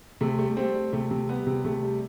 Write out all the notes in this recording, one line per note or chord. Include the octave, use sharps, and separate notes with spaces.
C3 A3
G3 A3
G3 A3 C4
G3
C3 A3
C3
G3 B3
C3
C3 A3
G3